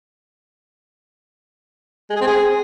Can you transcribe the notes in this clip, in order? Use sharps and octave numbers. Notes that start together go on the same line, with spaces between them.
G#3
G#4
C4
G#4